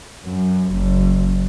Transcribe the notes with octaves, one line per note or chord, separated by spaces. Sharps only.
F#2
F#1